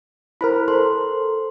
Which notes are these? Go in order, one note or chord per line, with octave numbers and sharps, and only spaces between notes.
E4 A#4 C5 B5 F6
A4 A#4 C5 C6